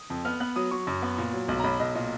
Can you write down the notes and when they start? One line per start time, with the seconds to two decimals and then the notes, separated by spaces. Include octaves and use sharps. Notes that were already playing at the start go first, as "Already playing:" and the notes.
Already playing: D#6
0.10 F2
0.25 B3 F6
0.40 B3 F#6
0.56 F#3 D#6
0.71 F#3 C#6
0.87 F#2
1.02 B3
1.18 A#2
1.33 F#3
1.48 B1
1.60 A#5
1.64 B1 B5
1.79 B1 D#5
1.95 A#2 D#5